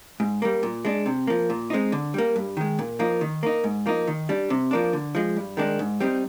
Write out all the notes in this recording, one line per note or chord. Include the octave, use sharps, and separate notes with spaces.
G#2
G3 A#3
A#2
G#3 D4
C3
F3 A#3
A#2
G#3 C4 D#4
D3
G3 A#3
G2
D#3 G#3
A#2
F3 A#3 D#4
D#3
A#3 D#4
G#2
F3 A#3 D#4
D#3
G3 D4
C3
F3 A#3 D4
D3
F3 G#3
G2
D#3 G#3 D4
G#2
G3 C4 D#4